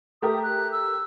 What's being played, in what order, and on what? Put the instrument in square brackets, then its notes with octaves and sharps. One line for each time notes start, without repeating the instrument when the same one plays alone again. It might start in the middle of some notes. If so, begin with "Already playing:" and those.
[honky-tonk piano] A3 G4 A#4 [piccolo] D#6
[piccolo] F#6
E6